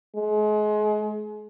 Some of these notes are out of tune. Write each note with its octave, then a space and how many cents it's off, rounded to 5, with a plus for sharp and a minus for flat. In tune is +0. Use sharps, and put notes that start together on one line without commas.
G#3 +35